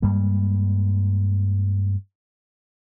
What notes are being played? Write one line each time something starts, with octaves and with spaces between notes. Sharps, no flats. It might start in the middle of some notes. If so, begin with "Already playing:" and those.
G2 G3 G#3 A#3